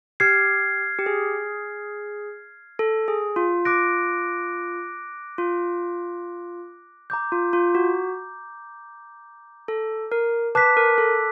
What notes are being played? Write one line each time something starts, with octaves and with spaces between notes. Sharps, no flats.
G4 F6 G#6 C7
G4
G#4
A4
G#4
F4
D6 F#6 A#6 D7
F4
A#5 D6 G6
F4
F4
F#4
A4
A#4
B4 A5 D6 F#6 B6
A#4
A4